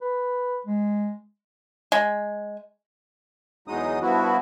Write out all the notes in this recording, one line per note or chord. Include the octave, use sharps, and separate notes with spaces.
B4
G#3
G#3
E2 F#3 G#3 D#4 D#6
G2 F3 B3 E4 F#4